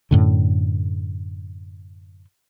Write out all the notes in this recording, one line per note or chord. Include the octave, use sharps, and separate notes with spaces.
F#2 A2 D3